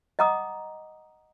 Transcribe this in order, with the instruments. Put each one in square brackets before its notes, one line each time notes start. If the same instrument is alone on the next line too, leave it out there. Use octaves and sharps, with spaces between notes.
[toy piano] D#5 F#5 A#5 D6 D#6